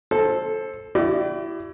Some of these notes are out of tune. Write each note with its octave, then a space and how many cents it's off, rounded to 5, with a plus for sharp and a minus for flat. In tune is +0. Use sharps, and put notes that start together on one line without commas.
A4 -5 C5 +20
E4 +20 G4 -45 D5 +25